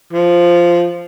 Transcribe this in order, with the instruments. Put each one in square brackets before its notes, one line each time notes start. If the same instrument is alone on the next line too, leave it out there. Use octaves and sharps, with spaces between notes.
[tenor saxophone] F3